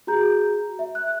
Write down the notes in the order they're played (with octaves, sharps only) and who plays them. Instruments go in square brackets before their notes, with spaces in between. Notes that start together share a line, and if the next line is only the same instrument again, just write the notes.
[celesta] F#4 G#4 A#5 G6
E5
F#6